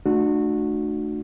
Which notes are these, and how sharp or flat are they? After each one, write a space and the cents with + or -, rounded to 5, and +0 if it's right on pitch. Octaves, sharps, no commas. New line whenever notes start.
A3 +0 D4 +35 F#4 -20